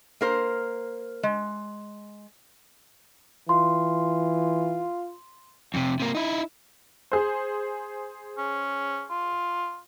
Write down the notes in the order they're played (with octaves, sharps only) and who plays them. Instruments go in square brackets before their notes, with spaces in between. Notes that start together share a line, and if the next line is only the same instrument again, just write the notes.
[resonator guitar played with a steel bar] A#3 A#4 C5
G#3
[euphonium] E3 [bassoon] F4 [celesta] C6
[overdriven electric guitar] F2 C3
C3 A#3
D#4 E4
[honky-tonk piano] G#4 C5
[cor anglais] C#4
F4